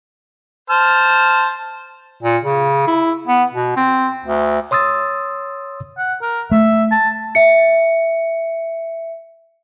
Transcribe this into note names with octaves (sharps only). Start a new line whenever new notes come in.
C5 A5 F6
A#2
C#3
E4
B3
B2
C4
D2
C#5 C6 D#6 E6 A6
F#5
A#4
A3 E5
A5
E5 C#7